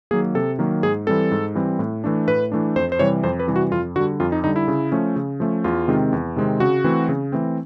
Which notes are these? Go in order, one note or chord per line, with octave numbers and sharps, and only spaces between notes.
D#3 F#3 A#3 G#4
C3 A4
D#3 F#3 A#3
G#2 G#4
E3 G3 C4 A4
G#2
E3 G3 C4
A2
E3 A3 D4
A2 B4
E3 A3 D4
F2 C5
C5
C3 E3 G3 C#5
F2 C5
B4
C3 E3 G3
F#4
F2 F4
D3 G3 F#4
F2 F4
D#4
D3 G3 D#4
E4
C#3
F3 A3 C#4
C#3
F3 A3 C#4
E2 F4
C3 D#3 G#3 C4
E2
C3 D#3 G#3 C4
C#3 F#4
E3 A3 C4
C#3
E3 A3 C4